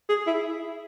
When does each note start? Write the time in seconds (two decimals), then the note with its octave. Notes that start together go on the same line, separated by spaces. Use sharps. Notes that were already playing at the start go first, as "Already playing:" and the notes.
0.09 G#4
0.27 E4